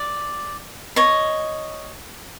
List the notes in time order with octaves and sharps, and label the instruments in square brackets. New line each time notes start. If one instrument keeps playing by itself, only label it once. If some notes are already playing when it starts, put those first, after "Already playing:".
Already playing: [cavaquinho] D5
C#5 D#5